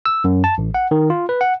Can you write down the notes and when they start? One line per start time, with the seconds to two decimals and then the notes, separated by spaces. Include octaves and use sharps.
0.06 E6
0.24 F#2
0.44 A5
0.58 A1
0.74 F#5
0.91 D#3
1.10 F4
1.29 B4
1.41 F#5